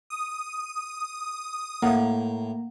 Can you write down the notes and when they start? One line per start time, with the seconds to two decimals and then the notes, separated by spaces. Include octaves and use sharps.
0.10 D#6
1.83 A2 A#3 F5 F#5